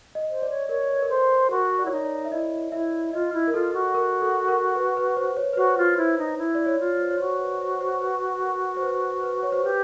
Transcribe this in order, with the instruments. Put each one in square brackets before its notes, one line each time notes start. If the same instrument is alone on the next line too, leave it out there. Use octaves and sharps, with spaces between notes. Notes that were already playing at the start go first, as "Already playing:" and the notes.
[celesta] D#5
[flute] C5
[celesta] D5
[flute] C#5
[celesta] A#4 [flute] C#5
[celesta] B4
A#4
[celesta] A4 [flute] C5
[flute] F#4 [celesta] A#4
[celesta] D5
[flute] E4 [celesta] C#5
[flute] D#4 [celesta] D5
[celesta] D5
E5
[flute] E4 [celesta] D#5
[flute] E4 [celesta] E5
[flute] F4 [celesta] D#5
[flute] E4
[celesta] A#4
[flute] F4 [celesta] A4
[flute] F#4
[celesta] A#4
A4
A#4
B4
B4
C5
C#5
B4
[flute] F#4 [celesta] C5
[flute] F4
[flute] E4 [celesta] C5
[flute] D#4
E4
[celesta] D5
C#5
[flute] F4
[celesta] C#5
C5
C#5
[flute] F#4 [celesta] C5
[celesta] B4
C5
C5
B4
A#4
C5
B4
B4
C#5
C5
[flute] G4 [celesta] B4